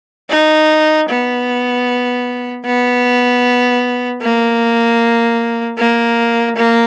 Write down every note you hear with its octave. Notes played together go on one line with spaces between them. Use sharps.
D#4
B3
B3
A#3
A#3
A#3